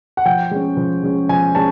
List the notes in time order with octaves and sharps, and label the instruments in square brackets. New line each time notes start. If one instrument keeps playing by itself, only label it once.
[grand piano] F#5
F3 G5
G#3 C#4
F3
G#3 C#4
F3 G#5
G#3 C#4 A5